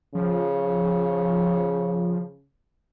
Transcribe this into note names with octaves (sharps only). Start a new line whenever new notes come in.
C#3 F3